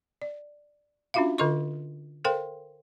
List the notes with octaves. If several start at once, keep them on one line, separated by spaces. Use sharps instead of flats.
D5
C#4 D4 F4 F#4 E5 F5
D3 F4 A4 D#5 C6 C#6
A4 A#4 C5 F5 G5 C6